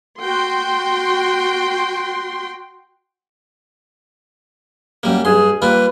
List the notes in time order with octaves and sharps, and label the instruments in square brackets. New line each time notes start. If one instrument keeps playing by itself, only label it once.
[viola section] F#4 G5 C6
[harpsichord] F#2 G3 A#3
[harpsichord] G2 C6 [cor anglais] G#4
[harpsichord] G3 A#3 F4 [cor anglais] B4